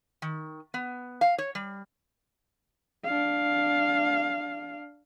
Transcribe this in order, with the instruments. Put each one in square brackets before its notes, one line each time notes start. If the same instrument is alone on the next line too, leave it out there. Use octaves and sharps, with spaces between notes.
[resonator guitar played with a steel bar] D#3
B3
F5
C#5
G3
[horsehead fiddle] D4 F5